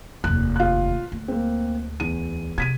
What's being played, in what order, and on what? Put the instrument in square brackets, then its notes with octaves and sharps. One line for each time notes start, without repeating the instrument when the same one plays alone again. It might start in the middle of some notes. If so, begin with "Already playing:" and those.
[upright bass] F1 D#2 [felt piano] F#6
[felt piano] F4 F#6
[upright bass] D2
[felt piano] A#3 C4
E2 D#7
[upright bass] C3 [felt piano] G#6 B6 D#7